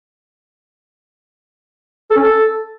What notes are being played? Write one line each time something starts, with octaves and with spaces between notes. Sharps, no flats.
A4
C#4
A4